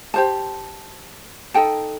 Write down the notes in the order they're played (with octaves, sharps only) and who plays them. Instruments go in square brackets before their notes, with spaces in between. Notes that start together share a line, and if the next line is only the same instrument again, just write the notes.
[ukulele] G4 C5 A5
D#4 A4 G5 A5